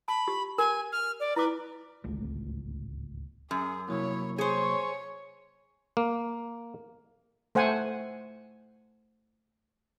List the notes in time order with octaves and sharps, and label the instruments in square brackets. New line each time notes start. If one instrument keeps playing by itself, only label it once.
[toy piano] A5 [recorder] B5
[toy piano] G4
[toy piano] A#4 [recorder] G#5
[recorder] F6
D5
[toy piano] E4 D6 [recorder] B4
[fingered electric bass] D1 G#1 C#2 A3
[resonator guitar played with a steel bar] F#2 [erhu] G#4
[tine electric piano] C3 F#3 A#3 [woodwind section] E4 [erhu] C#5
[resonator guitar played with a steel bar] G#4 C5 [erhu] C#5 [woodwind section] G#5 C#6
[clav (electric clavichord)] A#3
[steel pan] A3 C5 F#5 G#5